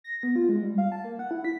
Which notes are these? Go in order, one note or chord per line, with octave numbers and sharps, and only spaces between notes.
A#6
B3
F4
G#3
G3
F5
A5
A#3
F#5
E4
B6